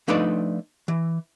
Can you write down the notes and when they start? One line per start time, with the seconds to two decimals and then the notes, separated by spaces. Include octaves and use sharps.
0.08 F3 A3 D4 D#4 B4 D5
0.88 E3